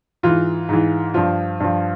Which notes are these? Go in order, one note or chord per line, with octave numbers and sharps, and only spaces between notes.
G#2 E3 F4
G#2 E3
G2 F3 F4
G2 F3